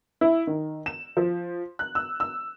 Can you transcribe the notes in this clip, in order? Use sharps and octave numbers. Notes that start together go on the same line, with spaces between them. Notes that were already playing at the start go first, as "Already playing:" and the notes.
E4
D#3
E7
F3
F#6
E6
E6